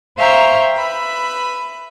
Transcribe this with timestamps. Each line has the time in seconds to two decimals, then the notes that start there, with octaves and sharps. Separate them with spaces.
0.18 C5 E5 F5 G5 A#5 C#6
0.74 B4 E5 B5